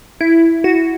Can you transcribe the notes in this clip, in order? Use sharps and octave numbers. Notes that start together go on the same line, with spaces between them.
E4
F#4